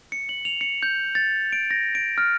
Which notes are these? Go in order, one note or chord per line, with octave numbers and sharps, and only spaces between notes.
C#7
F#7
F7
C#7
G6
A6
D7
A#6
D7
F6